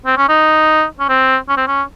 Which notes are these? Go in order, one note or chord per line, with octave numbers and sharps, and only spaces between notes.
C4
C#4
D#4
C#4
C4
C#4
C4
C#4